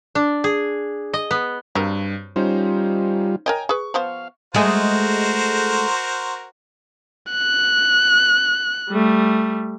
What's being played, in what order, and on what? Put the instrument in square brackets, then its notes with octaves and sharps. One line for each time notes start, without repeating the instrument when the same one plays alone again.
[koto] D4
G#4
D#5
B3
[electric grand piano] G2 [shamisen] F#3 C4 A#4
[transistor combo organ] G3 F4 [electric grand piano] C#4 D#4 C5
[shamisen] A#4 C#5 D#5 [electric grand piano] G5 G#5 A#5
[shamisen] G#4 B4 [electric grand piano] C#6
[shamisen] F3 B3 C5 [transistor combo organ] F5
[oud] G#3 A3 G#4 [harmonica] F#4 A#4 C5
[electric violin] F#6
[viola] G3 A3